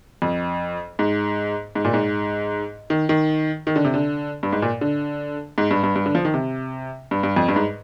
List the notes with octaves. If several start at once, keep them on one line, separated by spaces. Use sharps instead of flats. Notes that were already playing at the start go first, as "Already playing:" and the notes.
F2
G#2
G#2
A#2
G#2
D#3
D#3
D#3
D3
C3
D3
G2
G#2
A#2
D3
G#2
G2
G2
G2
D3
F3
D#3
C3
G2
G2
F2
G2
G#2